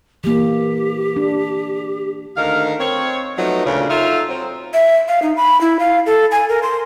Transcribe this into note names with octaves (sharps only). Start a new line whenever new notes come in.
E3 A#3 G4
D4
D2 D#3 A#4 F5
C4 C#5
F3 F#3 A3 B3 D#4
D2 A#2 C#3
D#4 F4 A4 E5 F5
F#3 C4
E5
F5
D#4
B5
E4
F5
A4
G#5
A#4
C6